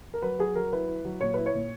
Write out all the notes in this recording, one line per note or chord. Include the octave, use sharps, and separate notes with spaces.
A#4
F#3 B4
F#3 G#4
F#3 A#4
E4 B4
E4
F#3
A#2 C#5
E4 B4
C#5
A#2